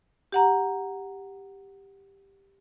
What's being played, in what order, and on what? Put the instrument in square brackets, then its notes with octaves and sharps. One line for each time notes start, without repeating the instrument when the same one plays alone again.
[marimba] G4 F#5 A#5